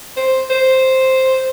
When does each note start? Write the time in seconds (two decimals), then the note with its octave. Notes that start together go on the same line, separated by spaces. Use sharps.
0.16 C5
0.50 C5